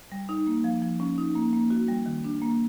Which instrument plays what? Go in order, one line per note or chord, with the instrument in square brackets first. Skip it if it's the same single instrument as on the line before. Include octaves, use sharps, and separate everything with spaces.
[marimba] G3
D#4
A#3
F3
F3
C#4
D#4
A#3
A#3
F#4
G3
D#3
D4
A#3